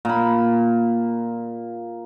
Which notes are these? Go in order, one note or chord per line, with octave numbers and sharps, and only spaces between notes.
A#2 B5